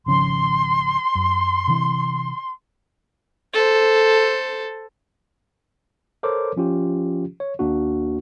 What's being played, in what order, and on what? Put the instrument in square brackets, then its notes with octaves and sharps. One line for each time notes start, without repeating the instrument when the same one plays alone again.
[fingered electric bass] G#1 C#3 F3 [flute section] C6
[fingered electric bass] F#2
C3 E3
[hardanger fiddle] A4 C5
[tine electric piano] A4 A#4 C5 C#5 D6
F3 C#4 F4 G4
C#5
D#2 A#3 D4 F#4